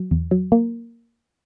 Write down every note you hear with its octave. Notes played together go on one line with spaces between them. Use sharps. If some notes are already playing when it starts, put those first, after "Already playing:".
Already playing: F#3
E2
F#3
A#3